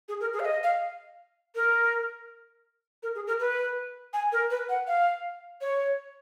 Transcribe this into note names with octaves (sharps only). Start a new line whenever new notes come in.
G#4
A#4
G#4
F5
D#5
F5
A#4
A#4
G#4
A#4
B4
G#5
A#4
B4
F#5
F5
C#5